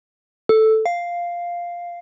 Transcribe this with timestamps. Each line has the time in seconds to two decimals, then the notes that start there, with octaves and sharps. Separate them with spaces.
0.49 A4
0.86 F5